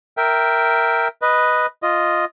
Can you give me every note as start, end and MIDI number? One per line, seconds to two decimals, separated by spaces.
0.17 1.08 70
0.17 1.08 76
0.17 1.08 79
1.22 1.66 71
1.22 1.66 75
1.83 2.25 65
1.83 2.25 75